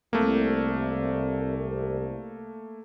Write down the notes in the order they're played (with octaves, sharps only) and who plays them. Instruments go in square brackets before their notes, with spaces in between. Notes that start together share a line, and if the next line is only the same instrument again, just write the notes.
[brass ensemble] C2 [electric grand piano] A3 A#3